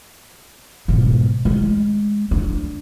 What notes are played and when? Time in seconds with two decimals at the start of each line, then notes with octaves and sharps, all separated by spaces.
0.88 G#2 B2
1.45 G#3
2.31 D4